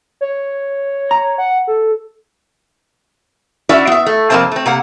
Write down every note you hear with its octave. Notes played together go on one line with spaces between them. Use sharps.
C#5
A#5
F#5
A4
C#4 E4 F#4 D5 E5
B3 E5
A3
F2 C3 A#3 C4 C5 A5
A3 C4
C3 A#3 F#5